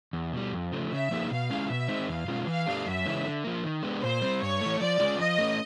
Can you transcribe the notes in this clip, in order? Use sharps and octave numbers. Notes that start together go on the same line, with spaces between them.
E2
B2 G3
F2
C#3 F3 A3
C#3 E5
F3 A#3 D#4 G#4
B2 F5
G#3 C#4 E4 G#4
B2 E5
G#3 C4 D#4
E2 F5
B2 G#3 C#4 F4
E3 F5
A3 D4 G4
F#2 E5
C#3 E3 G#3 C#4
D3
F3 A#3
D#3
G#3 B3 D4 G4
A#2 C5
G3 C4
G2 C#5
E3 A3
F3 D5
G#3 C#4 F4 G#4
F3 D#5
A3 C#4